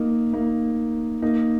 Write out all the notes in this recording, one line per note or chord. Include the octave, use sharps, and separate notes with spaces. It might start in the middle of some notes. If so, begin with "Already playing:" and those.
Already playing: A#3 D#4
A#3 D#4
A#3 D#4